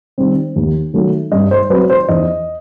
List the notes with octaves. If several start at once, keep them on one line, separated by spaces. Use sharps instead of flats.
D#3 G3 C4
D#2
D#3 F#3 A3
G2 D#5
C5
F#3 C4 B4
C5
E2 D#5